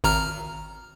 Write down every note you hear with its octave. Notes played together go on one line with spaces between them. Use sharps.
G#1 A#5 F6